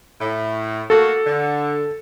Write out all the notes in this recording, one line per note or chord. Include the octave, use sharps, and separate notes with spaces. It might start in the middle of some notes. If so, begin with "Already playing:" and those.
A2
A3 A#3 F#4 A4
D3